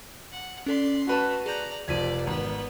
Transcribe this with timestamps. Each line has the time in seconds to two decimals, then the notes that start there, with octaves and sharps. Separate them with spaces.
0.32 F#5
0.66 C#4 A4 D5 C6 B6
1.07 A3 F#4 B4 A5
1.46 G#4 D5 A#5 G6
1.88 F1 F3 D5 G#6 B6 D#7
2.27 G#1 B3